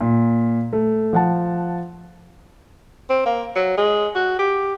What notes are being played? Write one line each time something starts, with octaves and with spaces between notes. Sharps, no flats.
A#2
A3
F3 F#5 A5
C4
A#3
F#3
G#3
F#4
G4